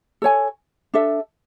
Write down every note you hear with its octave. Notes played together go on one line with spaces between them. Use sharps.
A4 C#5 G#5
D4 A4 E5